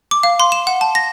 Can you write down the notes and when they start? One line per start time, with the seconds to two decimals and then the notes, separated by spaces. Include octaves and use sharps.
0.11 D6
0.23 F5
0.40 C6
0.52 E7
0.67 F#5
0.81 A5
0.95 A#6